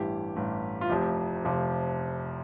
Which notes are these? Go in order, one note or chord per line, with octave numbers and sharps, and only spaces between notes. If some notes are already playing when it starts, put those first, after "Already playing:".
Already playing: A1 G2 E3 G4
A1 G2 E3
F4
F1 F2 C3 F3 G4
F1 F2 C3 F3